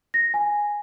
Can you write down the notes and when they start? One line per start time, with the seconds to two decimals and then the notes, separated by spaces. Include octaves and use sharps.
0.14 A#6
0.34 G#5